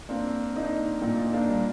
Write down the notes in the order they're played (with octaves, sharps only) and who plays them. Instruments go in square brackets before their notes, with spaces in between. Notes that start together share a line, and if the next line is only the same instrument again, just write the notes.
[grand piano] A#3 D4 [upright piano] C4
[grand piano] A#3 D4 [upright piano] D#4
[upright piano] A#2 [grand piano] A#3 D4
[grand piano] D#4
A#3 D4
[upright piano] G3